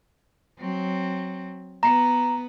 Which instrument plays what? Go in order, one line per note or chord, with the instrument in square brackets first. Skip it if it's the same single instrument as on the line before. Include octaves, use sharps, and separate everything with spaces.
[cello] F#3 C4
[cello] B3 [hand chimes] A#5